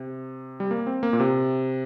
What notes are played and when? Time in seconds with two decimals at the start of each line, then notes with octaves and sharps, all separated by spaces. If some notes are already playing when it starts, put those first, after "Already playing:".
Already playing: C3
0.60 G3
0.71 A#3
0.87 C4
1.03 A#3
1.13 A#2
1.20 C3